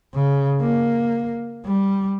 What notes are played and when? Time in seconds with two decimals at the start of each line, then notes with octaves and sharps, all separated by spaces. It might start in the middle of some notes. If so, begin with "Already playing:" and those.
0.14 C#3
0.61 A#3
1.66 G3